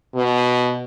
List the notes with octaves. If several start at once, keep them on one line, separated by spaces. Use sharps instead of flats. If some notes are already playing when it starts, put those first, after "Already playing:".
B2